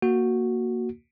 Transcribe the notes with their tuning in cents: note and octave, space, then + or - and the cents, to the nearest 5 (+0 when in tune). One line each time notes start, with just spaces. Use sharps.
A#3 +0 F#4 +0